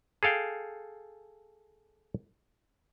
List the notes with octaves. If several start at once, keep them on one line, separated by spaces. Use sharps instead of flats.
G#4 A4 F5 G5